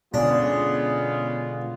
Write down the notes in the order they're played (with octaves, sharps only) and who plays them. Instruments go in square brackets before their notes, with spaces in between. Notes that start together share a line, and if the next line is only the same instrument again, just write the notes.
[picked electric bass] B2 D3 [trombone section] G#3 B3 F4 [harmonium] C#4 G#4 [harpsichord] D4